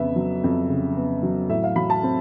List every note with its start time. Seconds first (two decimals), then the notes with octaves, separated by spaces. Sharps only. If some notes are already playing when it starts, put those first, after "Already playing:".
Already playing: F2 C#3 B3 E5
0.16 F#3
0.44 F2
0.69 C#3
0.96 B3
1.23 F#3
1.49 A2 E5
1.64 F5
1.76 F#3 B5
1.90 A5
2.03 C4